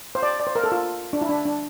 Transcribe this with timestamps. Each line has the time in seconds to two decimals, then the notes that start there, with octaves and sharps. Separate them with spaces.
0.15 C5
0.23 D5
0.40 D5
0.47 C5
0.55 A#4
0.64 A4
0.72 F4
1.13 D4
1.21 E4
1.29 D4
1.45 D4